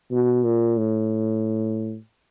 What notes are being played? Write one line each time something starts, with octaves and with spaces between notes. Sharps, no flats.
B2
A#2
A2